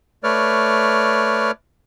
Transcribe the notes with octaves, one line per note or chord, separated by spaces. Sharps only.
A3 B4 C#5 D5 F6